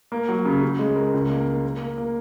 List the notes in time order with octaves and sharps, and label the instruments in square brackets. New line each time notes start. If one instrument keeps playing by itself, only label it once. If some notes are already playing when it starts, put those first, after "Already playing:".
[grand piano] A#3
F#3
C#3
C#3
G#3
A#4
C#2
A#3
A#3
A#4
A#3
A#3